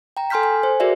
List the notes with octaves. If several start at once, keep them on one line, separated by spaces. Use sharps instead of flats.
G5 A#5
A4 G#5 C6 F6 G6 B6
G#5
C5
F#4 G#4 A#4 D5 E5